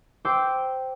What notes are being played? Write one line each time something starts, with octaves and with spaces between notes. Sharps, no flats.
C5 G5 D6 E6